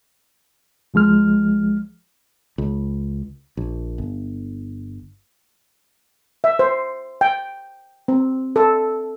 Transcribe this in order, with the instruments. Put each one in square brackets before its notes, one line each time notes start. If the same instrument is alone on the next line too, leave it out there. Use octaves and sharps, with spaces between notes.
[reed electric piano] C2 F3 G#3 F6
[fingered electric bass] C#2
A#1
G1
[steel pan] E5
C5
G5
C4
A4